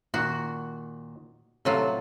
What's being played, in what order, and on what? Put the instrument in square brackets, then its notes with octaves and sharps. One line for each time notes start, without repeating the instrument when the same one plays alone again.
[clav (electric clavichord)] A#2 D#3 [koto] F#4
[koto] A2 F#3 F4 [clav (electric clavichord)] C3 A4